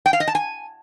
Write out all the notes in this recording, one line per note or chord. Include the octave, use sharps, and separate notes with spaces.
G5
F5
D#5
A5
G#5